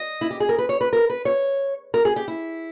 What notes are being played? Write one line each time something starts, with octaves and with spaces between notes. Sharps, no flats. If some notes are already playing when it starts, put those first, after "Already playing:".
Already playing: D#5
E4
G4
G#4
A#4
B4
C#5
B4
A#4
B4
C#5
A#4
G#4
G4
E4